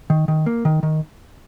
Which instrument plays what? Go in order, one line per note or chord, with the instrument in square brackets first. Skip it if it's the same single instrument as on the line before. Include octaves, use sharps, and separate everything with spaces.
[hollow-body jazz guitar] D#3
D#3
A#3
D#3
D#3